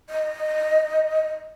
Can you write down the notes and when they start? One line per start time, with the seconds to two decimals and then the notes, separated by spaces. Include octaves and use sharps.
0.10 D#5